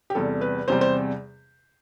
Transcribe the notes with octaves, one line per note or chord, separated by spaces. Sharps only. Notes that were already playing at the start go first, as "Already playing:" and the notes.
G4
E2 C3 G3 A4
B4
E2 C3 G3 C5
C5